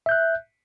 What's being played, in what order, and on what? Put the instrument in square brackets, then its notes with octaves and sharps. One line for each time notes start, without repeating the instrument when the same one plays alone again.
[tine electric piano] E5
G6
F#6